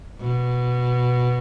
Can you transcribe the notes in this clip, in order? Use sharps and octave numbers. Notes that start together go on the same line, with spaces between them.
B2